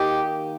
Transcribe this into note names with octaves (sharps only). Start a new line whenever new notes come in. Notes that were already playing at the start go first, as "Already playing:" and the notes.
Already playing: D#3 A#3 D#4 G4